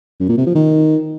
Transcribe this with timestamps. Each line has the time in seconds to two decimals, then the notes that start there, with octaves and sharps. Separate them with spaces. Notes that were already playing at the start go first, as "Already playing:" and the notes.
0.20 F#2
0.29 A#2
0.38 C3
0.46 F3
0.55 D#3